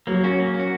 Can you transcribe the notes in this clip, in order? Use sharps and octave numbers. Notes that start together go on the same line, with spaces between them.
F#3 A#3
C#4 F#4
A#3
C#4
F#4